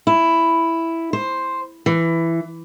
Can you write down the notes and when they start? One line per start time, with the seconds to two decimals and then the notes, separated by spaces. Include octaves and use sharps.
0.07 E4
1.13 C5
1.86 E3